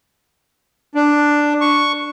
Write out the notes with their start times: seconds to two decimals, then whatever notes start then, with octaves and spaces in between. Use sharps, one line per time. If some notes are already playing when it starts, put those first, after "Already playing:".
0.95 D4
1.61 C#6